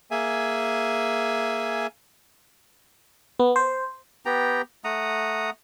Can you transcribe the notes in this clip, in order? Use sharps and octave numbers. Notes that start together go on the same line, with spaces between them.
A#3 G#4 E5 G#5
B3
C5
B3 G4 G5 A#5
A3 F#5 A#5 D#6